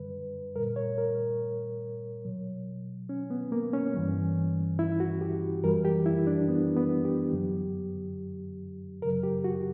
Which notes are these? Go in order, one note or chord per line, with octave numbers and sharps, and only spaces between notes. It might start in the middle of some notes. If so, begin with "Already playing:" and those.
Already playing: F#2 D3 G3 B4
A#2 G3 A#4
C#5
A#4
B2 F#3
C#4
B3
A#3
C#4
G2 E3 G3
E4
F#4
G4
F#2 E3 G3 A#4
G4
E4
D4
B3
B3
G4
F#2 D3 F#3
F#2 C#3 F#3 A#4
G4
F#4